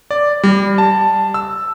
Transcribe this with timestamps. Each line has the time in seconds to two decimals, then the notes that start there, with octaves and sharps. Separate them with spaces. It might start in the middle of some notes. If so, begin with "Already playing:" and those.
0.11 D5
0.44 G3
0.78 A5
1.34 E6